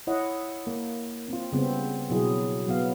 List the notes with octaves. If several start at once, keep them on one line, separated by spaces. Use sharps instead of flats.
E4 C#5 D#5 F#5
A#3
C4 F4
C#3 G3 B3 C4
B2 F#3 E4 G#4
F#3 B3 F5